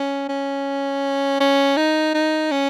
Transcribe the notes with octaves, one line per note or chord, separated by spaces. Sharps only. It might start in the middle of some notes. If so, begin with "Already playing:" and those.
Already playing: C#4
C#4
C#4
D#4
D#4
C#4